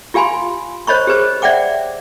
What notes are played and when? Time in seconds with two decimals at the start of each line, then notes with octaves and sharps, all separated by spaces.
0.14 F4 G4 F5 G#5 B5 C6
0.87 C5 C#5 D#5 B5 C#6
1.07 G4 G#4 B4 C5
1.42 D5 E5 F#5 G5 D6